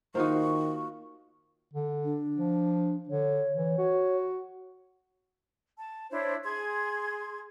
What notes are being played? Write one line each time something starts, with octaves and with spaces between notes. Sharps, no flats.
D#3 A#3 D#4 F4 F#4 C5 C#6
D3
D4
F3
D3 C#5
E3
F#4
A5
D4 E4 C5 C#5
G#4 C6 G#6